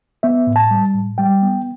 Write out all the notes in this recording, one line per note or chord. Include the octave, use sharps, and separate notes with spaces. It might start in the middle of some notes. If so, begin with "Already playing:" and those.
B3 E5
A2
A5
G3
A2
G3 G5
B3